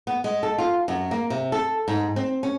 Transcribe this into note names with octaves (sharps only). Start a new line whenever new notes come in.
B3
G#3
A4
F4
F#2
A#3
C3
A4
G#2
C4
C#4